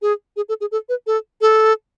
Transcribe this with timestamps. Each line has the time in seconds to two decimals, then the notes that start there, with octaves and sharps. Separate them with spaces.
0.02 G#4
0.36 G#4
0.49 A4
0.61 G#4
0.72 A4
0.89 B4
1.07 A4
1.41 A4